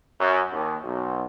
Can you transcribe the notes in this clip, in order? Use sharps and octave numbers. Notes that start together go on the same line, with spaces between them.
F#2
D#2
B1